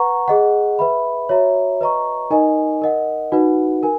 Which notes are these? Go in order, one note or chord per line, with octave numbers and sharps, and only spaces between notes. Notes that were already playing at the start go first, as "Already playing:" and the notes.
Already playing: B4 F#5 A#5 C#6
G#4 D#5 F#5
B4 E5 B5
F#4 C#5 E5 A#5
B4 D#5 A#5 C#6
D#4 A#4 D#5 G#5
A#4 D#5 F#5
D#4 F#4 B4 F#5
A#4 G#5